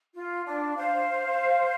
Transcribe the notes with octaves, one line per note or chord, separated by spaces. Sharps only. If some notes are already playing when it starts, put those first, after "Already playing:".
F4
D4
C5 F5